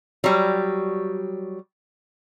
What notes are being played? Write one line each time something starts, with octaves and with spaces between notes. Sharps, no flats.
F#3 G3